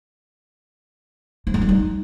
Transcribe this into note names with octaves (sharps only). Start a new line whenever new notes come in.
F3
G#3
G3
D#4